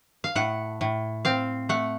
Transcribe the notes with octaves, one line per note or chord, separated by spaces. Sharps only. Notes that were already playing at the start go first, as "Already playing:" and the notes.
F5
A2 F#5
A2
C4 F5
A3 F#5